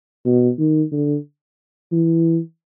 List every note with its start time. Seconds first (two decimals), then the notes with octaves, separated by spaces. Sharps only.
0.26 B2
0.59 D#3
0.92 D3
1.92 E3